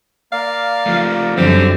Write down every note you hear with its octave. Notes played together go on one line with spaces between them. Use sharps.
A#3 D5 F5
F3 A3
F#2 D3 G3 C4 G4